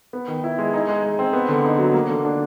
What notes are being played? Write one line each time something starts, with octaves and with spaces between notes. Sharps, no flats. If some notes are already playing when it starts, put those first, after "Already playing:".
B3
D#3
E4
G#3
D#4
G#3
G#3
C4
B3
D3
D#4
F#3
A#3
D3
D4